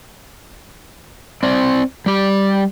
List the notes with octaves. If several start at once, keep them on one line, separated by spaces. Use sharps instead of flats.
C4 D5
G3 G4